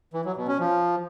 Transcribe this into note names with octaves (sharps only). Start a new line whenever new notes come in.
E3
F#3
B2
C#4
F3